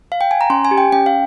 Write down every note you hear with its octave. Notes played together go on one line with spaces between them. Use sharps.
F5
G5
G#5
A#5
C#4 C6
G#5
G4
G5
C#4 G5
F5